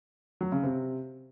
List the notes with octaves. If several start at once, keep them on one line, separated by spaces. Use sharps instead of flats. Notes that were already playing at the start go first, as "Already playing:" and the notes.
F#3
C#3
C3